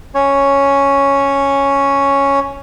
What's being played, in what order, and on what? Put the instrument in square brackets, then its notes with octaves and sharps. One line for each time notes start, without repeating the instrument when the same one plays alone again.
[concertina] C#4 C#5